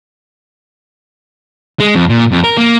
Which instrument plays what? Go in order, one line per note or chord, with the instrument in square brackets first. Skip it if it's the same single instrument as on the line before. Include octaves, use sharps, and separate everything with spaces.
[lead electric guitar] G#3
F2
A#2
F2
A#4
A#3